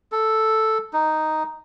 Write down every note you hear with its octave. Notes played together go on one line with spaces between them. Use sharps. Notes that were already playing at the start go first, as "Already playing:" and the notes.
A4
D#4